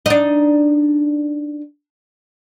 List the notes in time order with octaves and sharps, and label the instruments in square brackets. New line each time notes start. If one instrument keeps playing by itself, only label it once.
[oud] D4 D#4